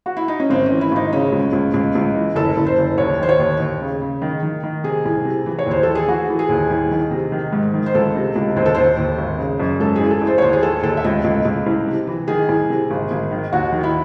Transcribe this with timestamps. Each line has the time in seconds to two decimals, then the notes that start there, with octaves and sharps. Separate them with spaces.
0.06 F#4
0.17 E4
0.28 D#4
0.40 C#4
0.50 G#1 C4
0.66 C#4
0.71 E3
0.81 E4
0.92 G#1 D#4
1.12 C#3 C#4
1.32 C#2
1.53 C#2
1.74 C#2
1.95 C#2
2.15 E3
2.35 F#1 A4
2.57 F#1
2.66 C5
2.78 F#1
2.98 D#2 C#5
3.19 D#3 C5
3.29 C#5
3.39 D#2
3.60 D#2
3.81 C#3
4.02 C#3
4.22 D#3
4.43 D#3
4.63 D#3
4.84 C3 G#4
5.05 C2
5.25 C3
5.46 E3
5.59 C#5
5.67 D#2 C5
5.83 E3 A4
5.95 G#4
6.08 E3 F#4
6.28 E3
6.39 G#4
6.49 D#2
6.70 C2
6.91 D#3
7.11 C3
7.32 D#3
7.52 G#2
7.74 D#3
7.86 C5
7.95 C#2 A4
8.15 C3
8.35 C#2
8.56 D#2 C5
8.66 A4
8.75 D#2 C5
8.98 D#2
9.18 G#1
9.38 C#3
9.60 F#2
9.80 G#2 A4
9.96 G#4
10.01 A1
10.11 A4
10.21 A1
10.27 C5
10.38 C#5
10.42 D#2 C5
10.53 G#4
10.63 D#3 A4
10.83 D#2 A4
10.97 E5
11.04 C#2 D#5
11.24 C#2
11.45 C#2
11.66 C2
11.87 C3
12.07 E3
12.28 D#3 G#4
12.49 C2
12.70 C3
12.90 G#1
13.11 G#1
13.31 D#3
13.52 D#2 F#4
13.72 D#3
13.83 E4